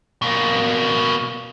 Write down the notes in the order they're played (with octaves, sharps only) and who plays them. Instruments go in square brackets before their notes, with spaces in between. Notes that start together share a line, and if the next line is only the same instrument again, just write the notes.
[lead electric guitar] B2 A#3